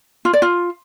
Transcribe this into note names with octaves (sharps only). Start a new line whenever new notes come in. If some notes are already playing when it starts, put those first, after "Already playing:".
F4
D5
F4